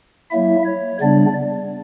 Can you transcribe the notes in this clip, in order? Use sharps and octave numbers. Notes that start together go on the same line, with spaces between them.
F#3 A#3 E4 E5
C#5
C#3 G3 B3 D4 D5